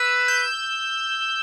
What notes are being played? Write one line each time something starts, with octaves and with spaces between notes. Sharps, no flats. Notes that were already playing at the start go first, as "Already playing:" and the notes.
Already playing: B4 E6
G6